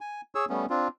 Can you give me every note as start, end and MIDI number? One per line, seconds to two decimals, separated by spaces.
0.01 0.21 80
0.35 0.45 68
0.35 0.45 73
0.35 0.45 88
0.49 0.66 55
0.49 0.66 57
0.49 0.66 59
0.49 0.66 61
0.70 0.88 60
0.70 0.88 62
0.70 0.88 65